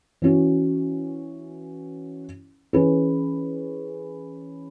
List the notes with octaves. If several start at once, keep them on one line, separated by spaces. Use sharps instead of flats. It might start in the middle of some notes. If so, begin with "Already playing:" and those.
E3 C#4 F#4
E3 C#4 G#4 B4